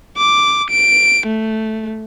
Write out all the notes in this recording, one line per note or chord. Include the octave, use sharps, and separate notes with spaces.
D6
D7
A3